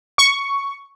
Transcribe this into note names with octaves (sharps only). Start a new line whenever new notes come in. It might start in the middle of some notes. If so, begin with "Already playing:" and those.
C#6